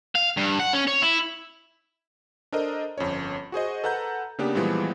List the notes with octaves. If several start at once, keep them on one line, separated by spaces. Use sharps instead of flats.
F5
G2
F#5
C#4
C#5
E4
D4 A4 A#4 C5 D#5
G1 F2 C#4 C#5
F#4 G#4 C5 D#5
A4 B4 F#5 A#5 G6
C#3 A#3 B3 D4 G4 B4
A#2 E3 F3 G3 G#3 B3